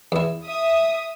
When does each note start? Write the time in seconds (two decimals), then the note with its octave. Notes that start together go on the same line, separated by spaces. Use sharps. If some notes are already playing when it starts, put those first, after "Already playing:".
0.12 E2 E4
0.46 E5 D#6